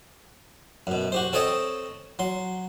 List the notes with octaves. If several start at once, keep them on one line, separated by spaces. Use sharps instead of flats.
F#2 B2
F#4 G4 C5
C4 A4 C#5 D#5 G5 A5
F#3 C6